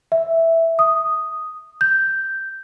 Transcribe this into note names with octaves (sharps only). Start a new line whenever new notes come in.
E5
D#6
G6